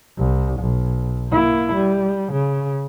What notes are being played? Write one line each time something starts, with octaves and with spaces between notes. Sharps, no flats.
C2
B1
A#3 E4
G3
C#3